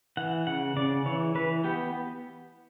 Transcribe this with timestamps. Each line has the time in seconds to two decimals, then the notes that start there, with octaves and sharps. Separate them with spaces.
0.17 E3 F#5
0.47 C#3 F#5
0.76 C#3 D5
1.06 E3 C#5
1.35 E3 B4
1.64 B3 G4